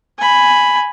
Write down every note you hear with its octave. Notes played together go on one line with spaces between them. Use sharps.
G#5 B5